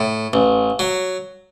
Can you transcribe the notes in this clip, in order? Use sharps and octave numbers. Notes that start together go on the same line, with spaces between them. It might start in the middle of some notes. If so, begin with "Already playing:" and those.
Already playing: A2
A1
F#3